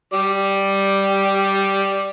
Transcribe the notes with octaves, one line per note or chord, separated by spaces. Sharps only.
G3 D5